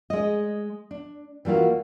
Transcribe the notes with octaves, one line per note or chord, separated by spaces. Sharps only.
G#3 D#5
D4
E3 G3 A#3 F4 F#4